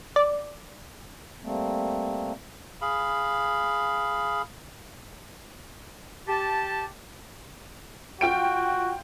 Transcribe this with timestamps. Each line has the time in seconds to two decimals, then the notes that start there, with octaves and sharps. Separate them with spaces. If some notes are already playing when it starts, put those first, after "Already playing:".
0.16 D5
1.42 G3 A3 A#3 C4
2.82 G#4 F5 B5
6.27 G4 A5
8.21 F4 F#4 G5 D7